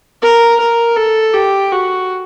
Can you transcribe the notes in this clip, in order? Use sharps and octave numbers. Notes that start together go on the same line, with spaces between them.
A#4
A#4
A4
G4
F#4